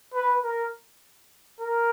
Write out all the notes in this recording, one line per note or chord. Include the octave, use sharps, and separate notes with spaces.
B4
A#4
A#4